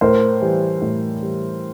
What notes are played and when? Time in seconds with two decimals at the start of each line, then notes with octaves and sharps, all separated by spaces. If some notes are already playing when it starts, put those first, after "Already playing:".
0.01 A2 A#4 C5
0.41 E3 G3
0.82 A2
1.21 E3 G3